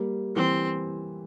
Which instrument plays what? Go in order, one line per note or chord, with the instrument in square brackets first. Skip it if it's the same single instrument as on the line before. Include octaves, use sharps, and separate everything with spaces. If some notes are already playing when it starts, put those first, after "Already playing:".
Already playing: [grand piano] G3 A#3
[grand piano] E3 G3 [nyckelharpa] C4